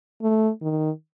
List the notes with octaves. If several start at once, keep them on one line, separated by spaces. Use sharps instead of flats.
A3
D#3